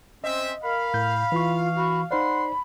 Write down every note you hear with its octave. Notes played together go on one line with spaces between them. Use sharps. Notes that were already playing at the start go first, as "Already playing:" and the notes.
C4 C#4 C5 D#5 E5
A#4 F5 B5
A2 G6
E3 F4 C#6
F#4 B5
D#4 C5 D5 F#5 B5 C6